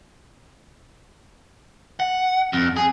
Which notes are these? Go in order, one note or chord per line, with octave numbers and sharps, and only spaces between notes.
F#5
F2
G#4